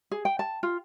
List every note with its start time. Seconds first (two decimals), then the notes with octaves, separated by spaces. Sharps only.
0.11 G#4
0.25 G5
0.39 A5
0.63 F4